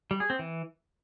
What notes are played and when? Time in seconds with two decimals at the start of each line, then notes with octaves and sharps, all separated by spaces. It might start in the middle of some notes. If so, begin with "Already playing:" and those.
0.11 G3
0.20 G#4
0.30 C4
0.39 E3